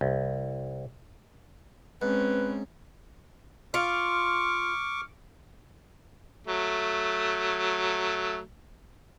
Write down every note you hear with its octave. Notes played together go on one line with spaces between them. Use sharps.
C2
G#2 C4 C#4 B4
F4 C#6 D6 F6
F#3 A3